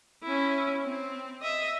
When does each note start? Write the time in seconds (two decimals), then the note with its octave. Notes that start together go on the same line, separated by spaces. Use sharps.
0.23 C#4 E4
0.85 C4
1.41 D#5 E5